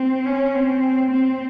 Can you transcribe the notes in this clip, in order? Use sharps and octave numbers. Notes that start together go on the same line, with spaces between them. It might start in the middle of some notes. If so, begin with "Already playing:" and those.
Already playing: C4
C#4
C4
C4